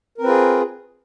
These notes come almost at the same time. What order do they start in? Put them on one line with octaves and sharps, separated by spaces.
A#4 C4 B4 F4 G#4